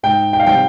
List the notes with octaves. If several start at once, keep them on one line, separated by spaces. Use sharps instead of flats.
G#2 G5
G5
F5
G3 C4 G5